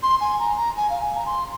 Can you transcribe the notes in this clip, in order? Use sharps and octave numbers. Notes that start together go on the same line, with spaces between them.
C6
G#5
A#5
A#5
G#5
F5
G#5
A#5
C6